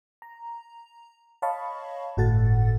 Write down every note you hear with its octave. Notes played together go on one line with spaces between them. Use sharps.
A#5
C#5 D#5 F5 A5 B5 C#6
G1 A2 F#4 A4 F#5 A6